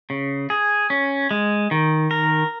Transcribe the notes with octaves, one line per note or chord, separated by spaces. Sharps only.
C#3
G#4
C#4
G#3
D#3
A#4